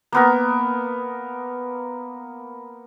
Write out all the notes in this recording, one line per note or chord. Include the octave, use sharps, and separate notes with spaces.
A#3 B3 A#4